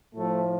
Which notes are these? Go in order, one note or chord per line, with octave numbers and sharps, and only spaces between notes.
A2 F3 A3